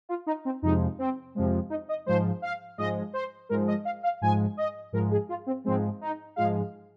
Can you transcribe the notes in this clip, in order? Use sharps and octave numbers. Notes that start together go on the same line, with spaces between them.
F4
D#4
C4
F2 C3 F3 G#3 D#4
C4
F2 C3 F3 G#3
D#4
D#5
G#2 F3 G#3 C5
F5
G#2 F3 G#3 D#5
C5
G#2 F3 G#3 A#4
D#5
F5
F5
G#2 F3 G#3 G#5
D#5
G#2 F3 G#3 A#4
G#4
F4
C4
G#2 F3 G#3 C4
D#4
G#2 F3 G#3 F5